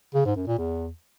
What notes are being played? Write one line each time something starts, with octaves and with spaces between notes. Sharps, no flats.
C#3
G#2
F#2
A#2
E2